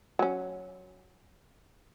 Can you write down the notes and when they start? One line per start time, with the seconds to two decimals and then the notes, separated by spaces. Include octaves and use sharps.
0.19 F#3 C#4